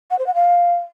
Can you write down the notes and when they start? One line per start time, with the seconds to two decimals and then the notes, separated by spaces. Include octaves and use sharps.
0.10 F#5
0.18 C5
0.26 F#5
0.34 F5